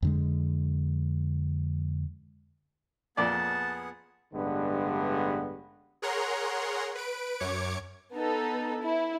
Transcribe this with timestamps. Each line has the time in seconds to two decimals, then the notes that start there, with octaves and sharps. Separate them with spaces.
0.02 F2 D3 G#3
3.17 F2 A#2 B3 G#4 D5 F#5 A5
4.34 A1 G2 D3 G#3 B3
6.02 G#4 A#4 C#5 F#5 A#5 C6
6.95 B4 D7
7.40 F#2 C#5 D6 G#6 C#7
8.12 B3 D#4 A4
8.82 E4